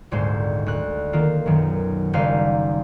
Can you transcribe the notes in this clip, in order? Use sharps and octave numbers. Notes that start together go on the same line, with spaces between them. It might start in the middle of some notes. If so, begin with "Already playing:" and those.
D#1 G#1 D2 G#2 G#3 C5
D2 F#6
D#3 A#3 F4
B1 F#2 D#3
F#1 G3 D#4 C5 F5